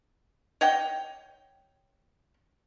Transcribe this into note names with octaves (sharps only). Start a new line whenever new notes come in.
C#5 D#5 F#5 G5